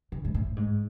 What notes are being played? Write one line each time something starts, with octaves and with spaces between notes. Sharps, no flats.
C#3
G#2
A2
G#2